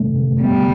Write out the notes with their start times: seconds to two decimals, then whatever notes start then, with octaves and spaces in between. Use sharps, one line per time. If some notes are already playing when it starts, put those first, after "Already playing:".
Already playing: C3 A3
0.16 A3
0.41 G3 B3